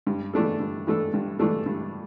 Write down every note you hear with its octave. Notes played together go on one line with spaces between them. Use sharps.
G2
E3 A3 D4 A4
G2
E3 A3 D4 A4
G2
E3 A3 D4 A4
G2